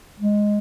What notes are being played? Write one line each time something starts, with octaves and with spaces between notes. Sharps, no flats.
G#3